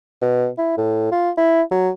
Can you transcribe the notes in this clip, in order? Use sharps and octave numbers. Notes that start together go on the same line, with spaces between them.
B2
E4
A2
F4
E4
F#3